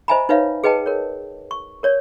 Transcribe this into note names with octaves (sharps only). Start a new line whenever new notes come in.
C5 D#5 E5 G#5 A#5 B5
D#4 B4 C#5 E5 F5
G#4 B4 D#5 G5 A5
A#4 C#5
C#6
A#4 C#5 D5